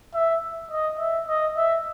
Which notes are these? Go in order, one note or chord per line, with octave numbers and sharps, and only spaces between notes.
E5
D#5
E5
D#5
E5